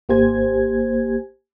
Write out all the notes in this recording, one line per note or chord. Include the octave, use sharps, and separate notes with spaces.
G#1 A#3 G4 C5 G#5 G#6